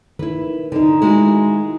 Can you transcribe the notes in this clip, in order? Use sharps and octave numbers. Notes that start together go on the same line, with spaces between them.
D#3 E4 B4
D3 D#3 D#4
G#3 E4 F#4